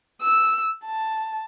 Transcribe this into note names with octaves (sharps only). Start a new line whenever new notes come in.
E6
A5